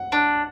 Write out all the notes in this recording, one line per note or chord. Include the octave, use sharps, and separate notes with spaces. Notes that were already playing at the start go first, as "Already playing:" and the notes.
Already playing: F#5
D4